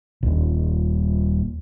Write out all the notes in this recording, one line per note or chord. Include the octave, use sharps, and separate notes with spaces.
D#1 G#1